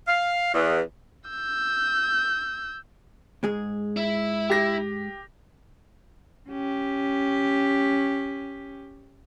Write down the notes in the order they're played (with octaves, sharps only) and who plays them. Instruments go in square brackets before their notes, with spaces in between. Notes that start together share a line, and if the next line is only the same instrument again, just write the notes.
[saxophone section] F5
E2
[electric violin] E6 G6
[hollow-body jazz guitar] G#2 G#3 G#4
[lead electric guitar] E4
[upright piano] G4 A#6
[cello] C#4 G4